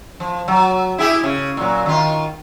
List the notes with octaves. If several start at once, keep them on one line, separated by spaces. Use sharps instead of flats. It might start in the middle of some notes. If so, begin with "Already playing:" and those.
F3
F#3
E4 G4 G#4
C#3
A#2 F#3
D#3 F4